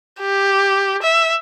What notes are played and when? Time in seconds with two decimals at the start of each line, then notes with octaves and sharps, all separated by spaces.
0.20 G4
1.02 E5